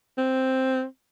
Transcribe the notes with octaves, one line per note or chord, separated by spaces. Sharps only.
C4